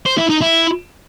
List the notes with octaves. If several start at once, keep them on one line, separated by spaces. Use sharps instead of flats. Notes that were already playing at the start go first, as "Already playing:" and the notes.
C5
E4
D#4
E4